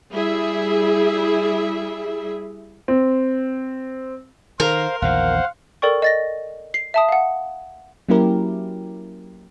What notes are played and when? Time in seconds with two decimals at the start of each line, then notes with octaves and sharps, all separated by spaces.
0.12 G3 E4 G#4 E5
2.88 C4
4.60 D#3 A#4 C5 F5
5.02 A#1 E2 D#3 C5 F5 F#5
5.82 A4 A#4 D5 G5 C#6
6.02 D#5 A6 A#6
6.74 C7
6.94 E5 A5 D#6
7.09 F5 F#5
8.09 F#3 A#3 C#4 E4 G4 A#4